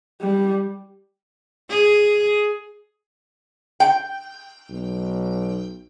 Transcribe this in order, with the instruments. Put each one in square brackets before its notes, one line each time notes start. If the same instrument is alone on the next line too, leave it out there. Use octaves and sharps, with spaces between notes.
[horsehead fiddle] G3
[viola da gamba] G#4
[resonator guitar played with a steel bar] G5
[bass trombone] B1